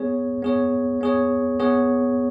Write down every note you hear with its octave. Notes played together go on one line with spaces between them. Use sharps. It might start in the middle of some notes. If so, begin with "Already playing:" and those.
Already playing: B3 G#4 C#5
B3 G#4 C#5
B3 G#4 C#5
B3 G#4 C#5